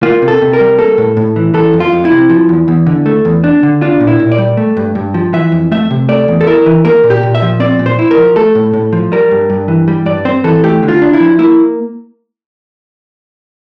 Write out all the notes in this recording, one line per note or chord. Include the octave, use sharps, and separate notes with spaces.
A#3 F4
C3
A4
C3
A#4
G3
A#3 A4
A2
A2
E3
E3 A4
F2
F4
F2
E4
C3
F3
E2
E2
D3
A3
E2
D4
D3
D4 F4
A#2
E4
A#2
D5
G3
A3
G2
G2
F3
E3 E5
F2
A3 E5
C3
A3 D5
E2
A4
E4 A#4
E3
A#3 A#4
A#2
G4
A#2
E5
F3
C4 D5
A#2
C5
E4
A#4
F3
A3 A4
A2
A2
F3
G3 A#4
G2
G2
E3
G3
G2 D5
C4 C5
E3 A4
A3 G4
D3
F4
D4
E4
F3
A#3 E4